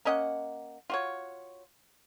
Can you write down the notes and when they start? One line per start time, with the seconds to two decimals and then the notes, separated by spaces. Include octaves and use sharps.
0.05 A#3 C#4 D#5 F#5
0.90 F4 F#4 C#5